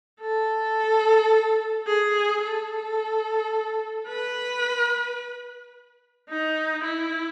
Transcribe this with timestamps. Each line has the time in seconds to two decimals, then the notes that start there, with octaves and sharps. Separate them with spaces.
0.20 A4
1.87 G#4
2.42 A4
4.08 B4
6.30 D#4
6.84 E4